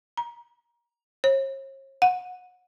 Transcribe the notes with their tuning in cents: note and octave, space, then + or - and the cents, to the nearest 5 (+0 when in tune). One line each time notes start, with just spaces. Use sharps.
A#5 +25
C#5 -45
F#5 -25